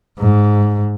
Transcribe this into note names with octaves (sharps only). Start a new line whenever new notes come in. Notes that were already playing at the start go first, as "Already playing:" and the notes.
G#2